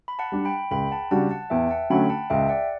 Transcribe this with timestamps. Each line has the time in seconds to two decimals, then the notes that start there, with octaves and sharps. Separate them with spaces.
0.08 B5
0.19 F#5 A5
0.32 G3 D4
0.45 G5 B5
0.71 C#2 G5 B5
0.91 F#5 A5
1.11 C#3 G3 D4 F#4 F#5 A5
1.31 F#5 A5
1.50 E2 E5 G5
1.71 F#5 A5
1.90 D3 F#3 A3 C#4 G5 B5
2.09 F#5 A5
2.30 C#2 E5 G5
2.49 D5 F#5